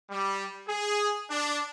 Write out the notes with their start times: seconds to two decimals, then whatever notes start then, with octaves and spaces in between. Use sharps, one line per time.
0.10 G3
0.68 G#4
1.30 D4